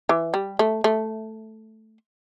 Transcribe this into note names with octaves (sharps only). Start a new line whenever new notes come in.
E3
G3
A3
A3